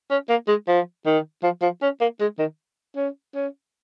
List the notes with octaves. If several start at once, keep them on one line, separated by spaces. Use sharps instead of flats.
C#4
A#3
G#3
F3
D#3
F3
F3
C#4
A#3
G#3
D#3
C#4
C#4